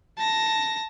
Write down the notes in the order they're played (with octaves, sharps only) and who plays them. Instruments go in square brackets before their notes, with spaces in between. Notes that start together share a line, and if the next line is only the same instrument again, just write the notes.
[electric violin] A5 A#6